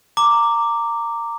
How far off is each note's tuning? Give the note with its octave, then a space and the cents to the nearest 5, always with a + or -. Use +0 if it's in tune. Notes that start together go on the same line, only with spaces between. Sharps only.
A#5 -15 D6 +0